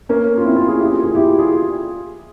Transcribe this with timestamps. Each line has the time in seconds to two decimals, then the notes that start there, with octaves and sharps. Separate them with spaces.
0.09 A#3 C#4
0.38 F4
0.45 C4 E4
0.56 C#4 F4
0.68 F4 G#4
0.79 E4 G4
0.92 F4 G#4
1.04 F4 G#4
1.15 E4 G4
1.39 F4 G#4